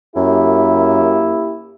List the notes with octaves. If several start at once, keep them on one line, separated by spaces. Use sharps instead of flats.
F#2 A#3 E4 G4